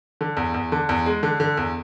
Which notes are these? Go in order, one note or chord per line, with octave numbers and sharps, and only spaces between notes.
D3
E2
E2
D3
E2
G#3
D3
D3
E2